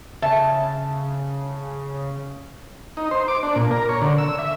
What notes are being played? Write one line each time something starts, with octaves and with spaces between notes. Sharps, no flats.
C#3 E5 A5
D#4
C5
D6
D4
A#2
A#4
C#5
D3
E6
E5